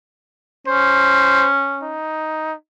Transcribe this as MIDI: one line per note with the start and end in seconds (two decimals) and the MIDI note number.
0.67 1.99 61
0.67 1.48 72
1.82 2.54 63